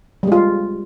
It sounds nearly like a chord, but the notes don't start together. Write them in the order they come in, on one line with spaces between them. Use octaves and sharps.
G3 G#3 F4